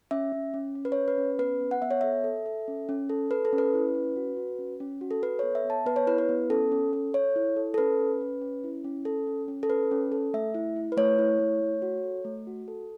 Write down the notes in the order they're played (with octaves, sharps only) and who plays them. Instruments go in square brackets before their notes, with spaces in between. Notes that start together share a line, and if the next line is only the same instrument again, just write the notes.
[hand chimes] C#4 E5
C#4
C#4
C#4
B4
C#4 C#5
B4
C#4
B3 B4
B3
F#5
B3 E5
C#5
A4 E5
A4
A4
C#4
C#4
A4
A4 B4
A4
C#4
B4
E4
C#4
F#4
F#4
C#4
C#4
F#4
A4
A4 B4
B3 C#5
E5
B3
A5
B3 B4
C#5
E4 B4
B4
B3
C#4 A4
C#4
A4
A4 C#5
E4
A4
A4
C#4 B4
C#4
C#4
C#4
E4
C#4
A4
C#4
C#4
A4
C#4 B4
C#4
A4
A3 E5
E4
E4
B4
A3 C#5
E4
A3
A3
F#4
A4
A3
F#4
A4